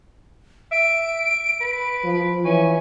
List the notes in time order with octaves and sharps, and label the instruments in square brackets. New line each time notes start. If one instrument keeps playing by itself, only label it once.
[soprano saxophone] E5 [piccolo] D7
[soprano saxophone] B4
[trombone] F3
[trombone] E3 [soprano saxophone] C#4 [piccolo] C#6